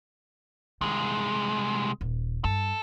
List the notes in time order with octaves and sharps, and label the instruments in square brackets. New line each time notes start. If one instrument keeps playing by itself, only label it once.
[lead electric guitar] C2 G#3 [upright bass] D#3 E3
[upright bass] D#1
[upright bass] G2 [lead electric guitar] A4